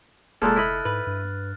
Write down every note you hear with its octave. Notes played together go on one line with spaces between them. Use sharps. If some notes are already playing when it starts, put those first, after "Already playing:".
F1 A#2 G#3 A#3 A4 F6 F#6 A6
E4 D#5 B5
G#2 B4
G2